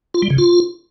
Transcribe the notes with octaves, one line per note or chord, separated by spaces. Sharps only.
F4
G3
C#3
F4